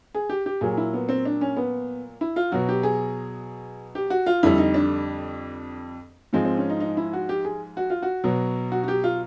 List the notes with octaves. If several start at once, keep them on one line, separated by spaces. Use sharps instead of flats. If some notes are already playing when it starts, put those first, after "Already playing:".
G#4
G4
G4
A#2 F#3 G#4
E4
B3
C4
D4
C#4
B3
E4
F4
B2 F#3 F#4
G4
G#4
G4
F#4
F4
F2 D3 G3 E4
D#4
D4
G#2 F3 G#3 C4
C4
C#4
D#4
D#4
E4
F#4
G4
G#4
F#4
F4
F#4
B2 F#3
F#4
F#4
G4
F4